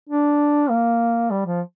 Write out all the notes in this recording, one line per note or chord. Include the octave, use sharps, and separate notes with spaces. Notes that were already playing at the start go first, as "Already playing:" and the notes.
D4
A#3
G3
F3